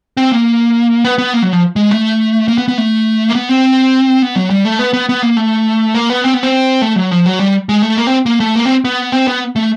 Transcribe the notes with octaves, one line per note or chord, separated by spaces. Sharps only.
C4
A#3
B3
B3
A#3
F#3
F3
G#3
A3
A#3
B3
B3
A3
A#3
B3
C4
B3
F#3
G3
A3
B3
B3
B3
A#3
A3
A#3
B3
C4
B3
C4
A3
F#3
F3
F#3
G3
G#3
A3
A#3
C4
A#3
A3
A#3
C4
B3
C4
B3
A3